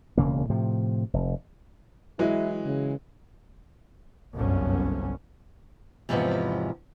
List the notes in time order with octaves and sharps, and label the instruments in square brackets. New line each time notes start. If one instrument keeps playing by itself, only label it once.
[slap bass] E1 D2 C#3 A#3
A2 C3 F3
F1
[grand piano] E3 F#3 G#3 [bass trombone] E4
[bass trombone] C#3
[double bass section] G1 C2 F#2 C#4
[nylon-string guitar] E2 G#2 C3 F3 B3 C#4